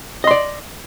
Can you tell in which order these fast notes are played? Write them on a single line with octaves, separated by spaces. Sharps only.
D#5 C6 D5